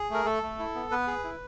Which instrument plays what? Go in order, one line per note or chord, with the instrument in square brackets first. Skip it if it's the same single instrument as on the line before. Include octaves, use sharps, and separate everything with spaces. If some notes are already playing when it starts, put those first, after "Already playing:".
Already playing: [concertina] G#4
A3 A#4
A3 A4
A3
E4
B3
B3 B4
G#4
E4